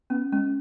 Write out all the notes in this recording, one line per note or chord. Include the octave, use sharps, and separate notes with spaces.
B3 C#4
G#3 C#4